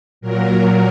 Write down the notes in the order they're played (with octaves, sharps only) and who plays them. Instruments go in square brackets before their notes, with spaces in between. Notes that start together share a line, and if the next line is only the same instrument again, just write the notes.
[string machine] A#2 F#3 A#4